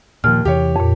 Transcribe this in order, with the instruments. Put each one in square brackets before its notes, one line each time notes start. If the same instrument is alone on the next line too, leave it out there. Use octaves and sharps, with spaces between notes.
[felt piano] D#2 [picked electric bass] A#2 F3 [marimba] F6
[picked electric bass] E2 C3 E3 [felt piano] G4 C#5
[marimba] F2 A#2